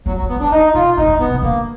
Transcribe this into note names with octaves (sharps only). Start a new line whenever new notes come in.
F#3 B3
F#3
G#3
B3
F#3
D4
D#3 D#4
B2 F4
A#2 D#4
G#2
A#2 B3
B2
D3 A#3